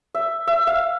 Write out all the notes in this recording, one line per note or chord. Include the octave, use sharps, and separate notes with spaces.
E5
E5
F5